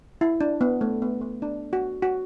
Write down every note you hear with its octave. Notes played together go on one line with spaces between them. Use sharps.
E4
D4
B3
A3
B3
B3
D4
F#4
F#4